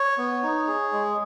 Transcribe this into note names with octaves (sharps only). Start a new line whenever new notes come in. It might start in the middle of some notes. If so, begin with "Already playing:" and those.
Already playing: C#5
B3
D#4
G#4
G#3